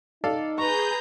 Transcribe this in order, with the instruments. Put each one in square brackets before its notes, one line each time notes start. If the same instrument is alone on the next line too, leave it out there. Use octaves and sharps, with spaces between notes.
[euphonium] D#4 [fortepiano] A4 D5 F5
[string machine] G#4 G6 [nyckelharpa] B4 A#5 [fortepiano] C#6